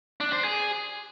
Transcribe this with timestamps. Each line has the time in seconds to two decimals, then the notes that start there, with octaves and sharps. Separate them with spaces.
0.20 D4
0.32 C5
0.44 G#4